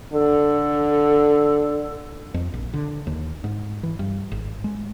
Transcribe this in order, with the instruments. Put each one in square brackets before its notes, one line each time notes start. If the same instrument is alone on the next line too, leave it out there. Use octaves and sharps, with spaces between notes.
[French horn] D3 [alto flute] A4
[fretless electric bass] F2
A#1
D3
D#2
G#2
E3
G2
G#1
G#3